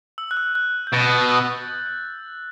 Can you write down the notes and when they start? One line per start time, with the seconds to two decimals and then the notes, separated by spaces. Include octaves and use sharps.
0.18 E6
0.31 F#6
0.37 E6
0.55 F#6
0.87 G6
0.93 B2 A6
1.29 E6